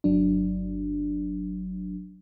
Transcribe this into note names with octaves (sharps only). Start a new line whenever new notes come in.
G1 F#3 D4